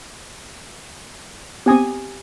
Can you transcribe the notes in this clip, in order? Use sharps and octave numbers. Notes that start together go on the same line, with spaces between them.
B3 C4 G4 G#5 D#6